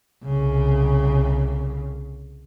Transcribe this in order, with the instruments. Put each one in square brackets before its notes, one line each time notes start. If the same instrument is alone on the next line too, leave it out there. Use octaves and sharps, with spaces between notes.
[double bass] C2 C#3